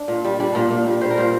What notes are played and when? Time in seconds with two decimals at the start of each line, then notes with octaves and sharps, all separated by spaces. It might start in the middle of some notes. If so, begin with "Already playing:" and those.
Already playing: D4
0.08 A#2
0.24 G3
0.40 G3 D4
0.55 A#2
0.71 A#2
0.87 G3
1.01 G3 C5
1.10 A#4
1.18 A#2 C5